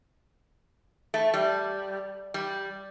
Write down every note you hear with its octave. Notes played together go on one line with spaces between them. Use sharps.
A3
G3
G3